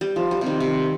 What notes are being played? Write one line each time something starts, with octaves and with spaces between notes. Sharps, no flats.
G3
F3
G3
C3
D#3
C3